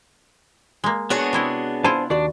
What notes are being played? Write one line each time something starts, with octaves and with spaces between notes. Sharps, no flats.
G#3 A#3
B3 D4 F#4 G#4 C#5
C3 E4 D#5
E4 F4 C5 G#5 A5
D#2 D4 F#4 D5